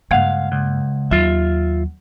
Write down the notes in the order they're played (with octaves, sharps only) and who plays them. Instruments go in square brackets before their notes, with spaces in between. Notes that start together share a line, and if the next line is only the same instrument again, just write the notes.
[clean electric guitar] C#2 F5 [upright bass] G2 A#3 [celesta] F#5 G#6
[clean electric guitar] C#2
[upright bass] D#2 F#3 [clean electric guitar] F4 E5